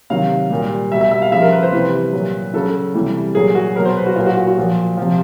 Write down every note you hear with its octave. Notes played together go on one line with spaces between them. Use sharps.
C3 D#3 F#3 F5
A#2 G3
B2 G3 E5
E5
E5
F5
C#3 F3 E5
A#4
B4
C5
C3 E3 G3 B4
A#2 F#3
C#3 F#3 A4
C3 E3 G3
A#2 F#3 G#4
F#4
B2 F#3 A#4
C5
B4
F#4
A#2 F#3 F4
F#4
F#4
F#4
A#2 F3
C3 F3